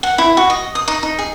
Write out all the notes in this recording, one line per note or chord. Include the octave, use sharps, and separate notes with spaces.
F#5
E4
F#4
D#5
D#6
D#4
D#4
G#4